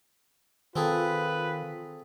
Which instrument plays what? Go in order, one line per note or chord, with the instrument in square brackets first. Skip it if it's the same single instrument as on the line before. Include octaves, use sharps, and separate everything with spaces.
[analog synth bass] D#3 [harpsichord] C4 G#4 A4 [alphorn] F4 [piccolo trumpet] B4